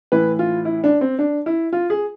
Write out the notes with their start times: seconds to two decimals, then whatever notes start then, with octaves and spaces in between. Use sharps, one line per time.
0.12 A2 E3 B4
0.39 F4
0.65 E4
0.84 D4
1.01 C4
1.19 D4
1.46 E4
1.73 F4
1.90 G#4